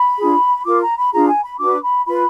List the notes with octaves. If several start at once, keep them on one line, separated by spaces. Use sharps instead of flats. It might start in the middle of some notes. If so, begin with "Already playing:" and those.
Already playing: B5
D4 F4 G#4
F4 A#4 D6
A#5
B5
D4 F4 G#4 A#5
G#5
B5
D4 F#4 B4 D6
B5
F4 B4 B5